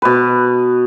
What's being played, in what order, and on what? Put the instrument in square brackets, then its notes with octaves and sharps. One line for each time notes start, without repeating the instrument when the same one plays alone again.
[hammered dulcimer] B2 B4